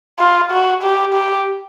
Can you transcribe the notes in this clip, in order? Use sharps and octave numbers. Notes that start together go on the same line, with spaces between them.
F4
F#4
G4
G4